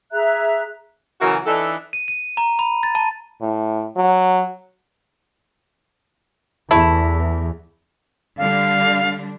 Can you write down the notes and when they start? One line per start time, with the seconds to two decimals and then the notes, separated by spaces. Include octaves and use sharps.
0.12 G#4 E5 A#5 F#6
1.21 C#3 E3 F#3 F#4 A#4
1.46 E3 D4 D#4 A4
1.93 D#7
2.08 D#7
2.37 A#5
2.59 B5
2.83 A6
2.95 A5
3.41 A2
3.96 F#3
6.71 E2 A3 E4
8.38 D3 G3 D4 F5